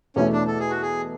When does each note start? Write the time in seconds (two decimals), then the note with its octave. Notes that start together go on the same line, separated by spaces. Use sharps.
0.16 E2 B2 A3 C#4 E4
0.32 D4
0.47 A4
0.60 G#4
0.70 F#4
0.82 G#4